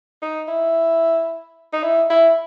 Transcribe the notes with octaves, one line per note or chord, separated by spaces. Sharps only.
D#4
E4
D#4
E4
E4